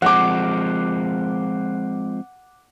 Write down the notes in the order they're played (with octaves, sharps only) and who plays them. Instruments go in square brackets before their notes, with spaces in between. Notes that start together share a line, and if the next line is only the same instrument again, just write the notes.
[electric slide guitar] F3 G#3 C4 [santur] F#5 D6